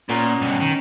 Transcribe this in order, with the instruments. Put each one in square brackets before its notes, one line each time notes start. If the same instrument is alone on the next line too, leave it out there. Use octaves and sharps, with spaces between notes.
[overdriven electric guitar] A#2 [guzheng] B3 C#4 D#4
[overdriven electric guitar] G2 B2
D#3